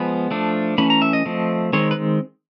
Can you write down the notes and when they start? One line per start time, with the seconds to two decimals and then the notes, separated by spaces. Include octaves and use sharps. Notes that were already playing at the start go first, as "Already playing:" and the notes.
Already playing: F3 G#3 B3 B5
0.31 F3 A3 D4
0.78 E3 A3 C#4 B5
0.90 A#5
1.02 E5
1.13 D#5
1.25 F3 A3 C4
1.73 D#3 G#3 C4 C#5
1.91 B4